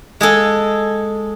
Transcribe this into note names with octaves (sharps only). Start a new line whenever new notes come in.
G#3 G#4 A4